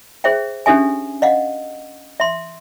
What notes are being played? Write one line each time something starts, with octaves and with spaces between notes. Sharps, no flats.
G#4 C5 E5 G5
C#4 D4 G4 A4 E5 G#5
D#5 F5 F#5
E5 C6